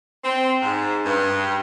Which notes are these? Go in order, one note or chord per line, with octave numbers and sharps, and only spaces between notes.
C4
G#2
G2